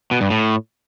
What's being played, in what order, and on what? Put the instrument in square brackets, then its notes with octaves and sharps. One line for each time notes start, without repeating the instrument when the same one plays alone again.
[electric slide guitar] B2
G2
A2